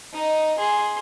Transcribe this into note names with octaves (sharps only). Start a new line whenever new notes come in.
D#4 D#5
G#4 C6